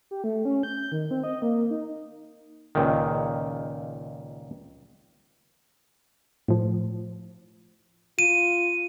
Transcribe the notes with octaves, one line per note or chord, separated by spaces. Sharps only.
G4
A3
C#4
G6
D#3
C4
D#5
A#3
D#4
C#2 A#2 D#3
A2 F3
F4 D#7